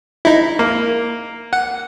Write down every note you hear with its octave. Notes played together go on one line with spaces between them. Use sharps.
D#4 E4
A#3
F#5